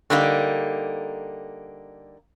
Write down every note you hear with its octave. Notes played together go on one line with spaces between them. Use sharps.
D3 G3 A#3 D#4